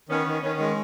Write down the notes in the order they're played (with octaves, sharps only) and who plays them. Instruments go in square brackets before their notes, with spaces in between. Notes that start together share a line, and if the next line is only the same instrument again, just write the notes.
[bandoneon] D#3 [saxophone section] B3 C#4
[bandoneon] D#3
[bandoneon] D#3 [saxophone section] B3 C#4
[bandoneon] G#3